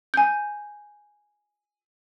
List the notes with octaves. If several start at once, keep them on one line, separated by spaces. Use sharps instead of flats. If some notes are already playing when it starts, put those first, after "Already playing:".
G#5 G6